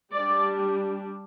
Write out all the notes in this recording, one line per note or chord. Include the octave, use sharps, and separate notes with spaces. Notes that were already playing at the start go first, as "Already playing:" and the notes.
G3 D5
D4